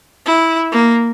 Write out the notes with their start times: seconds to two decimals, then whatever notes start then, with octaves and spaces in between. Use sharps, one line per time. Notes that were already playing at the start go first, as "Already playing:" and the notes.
0.26 E4
0.72 A#3